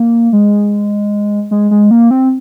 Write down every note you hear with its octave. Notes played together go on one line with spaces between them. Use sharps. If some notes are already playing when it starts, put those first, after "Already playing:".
Already playing: A#3
G#3
G#3
G#3
A#3
C4